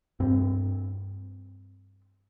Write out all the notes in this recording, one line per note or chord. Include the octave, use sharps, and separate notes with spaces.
G2 C4